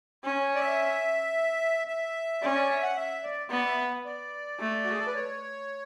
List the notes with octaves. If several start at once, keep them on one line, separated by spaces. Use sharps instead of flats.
C#4
D5
E5
E5
C#4 D5
D5
E5
F#5
E5
D5
B3 D5
E5
F#5
D5
A3
F#4
G#4
A4
B4
C#5